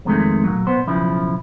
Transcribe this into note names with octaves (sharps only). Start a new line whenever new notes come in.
F2 C3 D#3 G#3 A3
A#2 F#3
A#2 B3 C5
B1 C#3 F3 E4